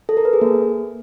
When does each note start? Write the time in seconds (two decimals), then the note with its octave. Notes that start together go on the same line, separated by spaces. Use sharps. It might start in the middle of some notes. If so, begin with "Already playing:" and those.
0.09 A4
0.17 A#4
0.25 B4
0.33 G#4
0.41 A#3